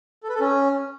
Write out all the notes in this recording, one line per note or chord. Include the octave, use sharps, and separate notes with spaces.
A4
B4
A4
C#4